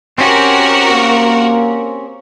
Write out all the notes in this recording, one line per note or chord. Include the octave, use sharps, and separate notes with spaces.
C4 C#4 F#4 G4 A#4
A#3